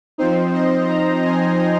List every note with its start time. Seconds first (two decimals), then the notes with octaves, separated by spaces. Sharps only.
0.18 F3 C4 D#4 C5
0.54 D#5
0.89 A#5
1.25 G#5